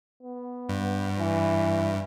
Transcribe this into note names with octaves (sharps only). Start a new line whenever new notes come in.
B3
G2
E3